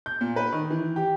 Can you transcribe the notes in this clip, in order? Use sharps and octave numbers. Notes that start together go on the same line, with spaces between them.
G6
A#2
B4
D#3
E3
G4